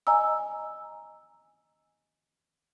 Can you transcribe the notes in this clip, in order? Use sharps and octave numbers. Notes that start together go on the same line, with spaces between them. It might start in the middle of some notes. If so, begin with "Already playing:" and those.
D#5 G#5 A#5 E6